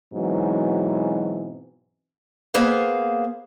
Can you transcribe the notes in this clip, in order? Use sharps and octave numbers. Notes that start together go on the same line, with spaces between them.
G#2 B2 E3 F#3 C4
A#3 B3 G#4 C5 F5